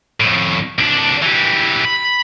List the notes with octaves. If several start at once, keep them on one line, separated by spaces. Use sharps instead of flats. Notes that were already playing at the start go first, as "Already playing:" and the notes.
F2 A2
C2 D4
E3 G3
B5